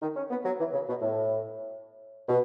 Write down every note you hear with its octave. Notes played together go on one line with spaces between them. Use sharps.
D#3
C#4
B3
F#3
E3
C#3
B2
A2
B2